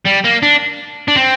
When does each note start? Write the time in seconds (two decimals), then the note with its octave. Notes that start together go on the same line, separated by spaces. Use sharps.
0.06 G3
0.25 A#3
0.43 D4
1.08 D4
1.16 C4